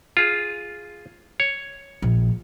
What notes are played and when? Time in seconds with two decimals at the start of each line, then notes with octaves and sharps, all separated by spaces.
0.17 F4 G#4
1.40 C#5
2.02 A#1